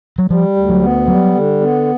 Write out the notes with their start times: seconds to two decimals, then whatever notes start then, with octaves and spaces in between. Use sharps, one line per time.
0.18 F#3
0.30 F3 G3
0.56 D2
0.70 F#3
0.82 B3
1.08 F#3 G3
1.35 D3
1.61 B3